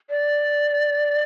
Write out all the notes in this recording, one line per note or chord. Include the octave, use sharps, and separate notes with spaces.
D5